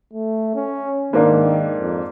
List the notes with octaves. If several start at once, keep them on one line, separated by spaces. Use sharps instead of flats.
A3
C#4
G#2 D#3 A#3 D4
F2